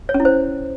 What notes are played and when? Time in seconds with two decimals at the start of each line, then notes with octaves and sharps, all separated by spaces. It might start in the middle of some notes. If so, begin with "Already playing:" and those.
0.09 C#5
0.14 C#4
0.20 E4
0.25 C5